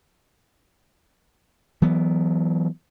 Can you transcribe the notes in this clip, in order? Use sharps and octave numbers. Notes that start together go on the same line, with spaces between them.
E3 F#3 B3